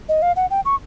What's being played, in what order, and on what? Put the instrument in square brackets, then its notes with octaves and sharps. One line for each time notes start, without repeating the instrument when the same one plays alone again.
[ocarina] D#5
F5
F#5
G5
C#6